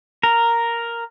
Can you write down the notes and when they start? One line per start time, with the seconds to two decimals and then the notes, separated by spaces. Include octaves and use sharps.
0.23 A#4